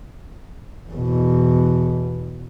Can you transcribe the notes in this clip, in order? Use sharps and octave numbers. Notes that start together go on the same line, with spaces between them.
E2 B2